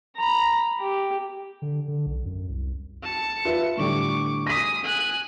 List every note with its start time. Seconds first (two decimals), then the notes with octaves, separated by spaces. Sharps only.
0.17 A#5 B5
0.79 G4
1.62 D3
1.88 D3
2.06 B1
2.25 F#2
2.49 C2
3.03 A5 C#7
3.45 F4 B4 E5
3.77 A2 D3 G3 C#6 D6
4.47 G#5 D#6 A#6 B6
4.84 G#5 F#6